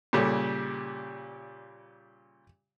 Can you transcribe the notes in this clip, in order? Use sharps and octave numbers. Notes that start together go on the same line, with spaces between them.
A#2 C#3 G3 A4